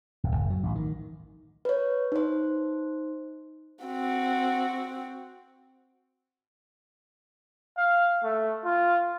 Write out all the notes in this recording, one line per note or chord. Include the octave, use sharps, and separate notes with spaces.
D1
F#1
F#3
A1
D#3
B4 C#5
D#4 C5
C4 F#4
F5
A3
F4